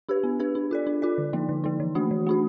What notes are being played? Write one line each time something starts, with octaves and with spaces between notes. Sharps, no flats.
D4 G4 B4
B3
D4 G4 B4
D4
F4 A4 D5
D4
F4 A4 D5
D3
F3 A#3 D#4
D3
F3 A#3 D#4
E3
A3 D4 F#4
E3
A3 D4 F#4